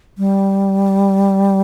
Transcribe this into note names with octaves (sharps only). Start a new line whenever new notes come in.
G3